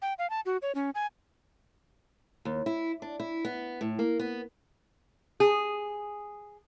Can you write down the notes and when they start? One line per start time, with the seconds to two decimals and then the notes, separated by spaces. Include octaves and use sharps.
0.02 G5
0.19 F5
0.30 A5
0.46 F#4
0.62 C#5
0.75 C#4
0.95 G#5
2.45 D#2
2.66 E4
3.02 D4
3.20 E4
3.45 B3
3.81 A2
3.99 A#3
4.19 B3
5.40 G#4